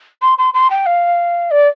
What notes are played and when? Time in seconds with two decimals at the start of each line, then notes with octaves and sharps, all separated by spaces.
0.22 C6
0.38 C6
0.54 C6
0.70 G5
0.86 F5
1.51 D5